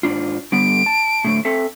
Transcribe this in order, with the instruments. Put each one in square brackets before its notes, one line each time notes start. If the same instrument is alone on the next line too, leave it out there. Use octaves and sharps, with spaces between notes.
[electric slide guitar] G#2 D4 F4
[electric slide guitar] D3 G3 B3 [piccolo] D7
[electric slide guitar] A5
A2 D3 A3
C4 A4 E5